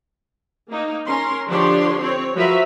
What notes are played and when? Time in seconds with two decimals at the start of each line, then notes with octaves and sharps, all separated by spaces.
0.70 A#3 D#4
1.06 C#4 A#4 C6
1.48 D3 F3 D4 G4 C#5 C6
2.01 C4 C#5
2.35 F3 F#3 F#4 A#4 B4 E5